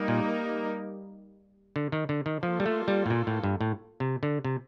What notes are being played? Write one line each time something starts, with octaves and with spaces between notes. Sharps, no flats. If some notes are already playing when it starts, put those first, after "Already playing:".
Already playing: G3 A#3 D#4 A#4
A#2
D3
D#3
D3
D#3
F3 A#3 F4 A4
G3
A3
G3
A2
A#2
A2
G2
A2
C3
D3
C3